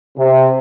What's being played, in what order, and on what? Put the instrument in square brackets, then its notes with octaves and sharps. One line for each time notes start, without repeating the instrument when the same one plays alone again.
[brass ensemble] C3